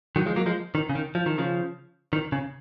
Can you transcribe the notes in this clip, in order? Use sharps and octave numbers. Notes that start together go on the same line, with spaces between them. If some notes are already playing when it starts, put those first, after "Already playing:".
D#3 F#3
F3 G#3
F#3 A#3
F3 G#3
D#3
C#3
D#3
F3
D#3
C#3 F3
D#3
C#3